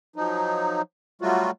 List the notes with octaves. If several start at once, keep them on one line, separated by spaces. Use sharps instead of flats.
F3 F#3 D#4
F#3 G3 A3 F4 F#4